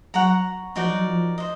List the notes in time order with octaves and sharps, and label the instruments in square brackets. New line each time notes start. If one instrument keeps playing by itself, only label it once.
[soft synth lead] F#3 [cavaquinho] C#5 F#5 A#5
[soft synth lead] F3 [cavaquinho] D#4 F#4 A#4 D5
[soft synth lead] F#3
F3
[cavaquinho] C5 D#5